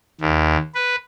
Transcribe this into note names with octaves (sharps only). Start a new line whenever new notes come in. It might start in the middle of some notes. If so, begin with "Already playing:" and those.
D#2
B4